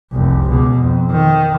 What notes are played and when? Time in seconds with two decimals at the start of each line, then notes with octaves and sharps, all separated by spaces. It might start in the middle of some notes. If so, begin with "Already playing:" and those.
0.12 F1 C2
0.49 C#2 B2
0.79 F2
1.12 D#3